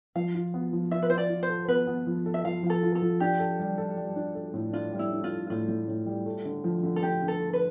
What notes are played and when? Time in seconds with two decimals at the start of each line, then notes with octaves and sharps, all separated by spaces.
0.15 F3 F5
0.35 F4
0.54 B3
0.73 F3
0.91 F4 E5
1.02 B4
1.10 F4 C5
1.18 D5
1.30 F4
1.43 C5
1.49 A4
1.68 B3 B4
1.87 B3
2.07 F3
2.26 A4
2.34 E5
2.44 F3 F5
2.63 F3
2.70 A4
2.83 F4
2.95 A4
3.02 F3
3.20 D4 G4
3.39 A4
3.59 G3
3.78 A4
3.97 G3
4.16 D4
4.35 A4
4.54 A2
4.73 D4 F4
4.93 G3
4.99 E4
5.12 D4
5.24 F4
5.31 A4
5.50 A2 F4
5.68 A2
5.88 A2
6.07 G3
6.26 A3
6.45 D3
6.64 F3
6.83 D3
6.96 A4
7.02 D3 G4
7.22 D3
7.28 A4
7.40 A3
7.53 B4